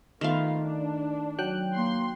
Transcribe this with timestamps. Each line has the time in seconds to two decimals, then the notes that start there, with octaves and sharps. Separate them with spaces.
0.21 D#3 A3 B3 F4 F5
0.61 D4
1.38 F#3 G5 F#6
1.75 A#3 C6